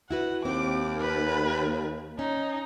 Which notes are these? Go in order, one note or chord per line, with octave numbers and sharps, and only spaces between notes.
E4 F#4 B4 F#5
D#2 C4 G4 D6
A#3 B4
C#4 D#4